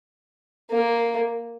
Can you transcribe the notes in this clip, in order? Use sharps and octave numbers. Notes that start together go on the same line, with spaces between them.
A#3